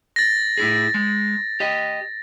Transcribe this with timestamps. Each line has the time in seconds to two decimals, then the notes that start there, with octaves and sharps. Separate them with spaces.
0.16 A6 A#6
0.58 A2 E4 G#4
0.94 G#3
1.60 G4 D#5